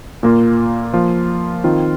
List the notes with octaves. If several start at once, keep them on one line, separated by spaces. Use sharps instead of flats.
A#2 A#3 F4
F3 A#3 F4
D#3 C4 F4